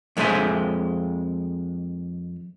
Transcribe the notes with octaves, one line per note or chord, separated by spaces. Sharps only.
F2 G#3 A4 C5 E5 G#5